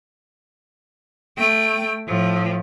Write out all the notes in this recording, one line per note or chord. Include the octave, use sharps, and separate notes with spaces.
A3 G5
A2 F3